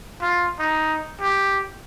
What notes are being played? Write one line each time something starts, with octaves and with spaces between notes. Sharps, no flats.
F4
D#4
G4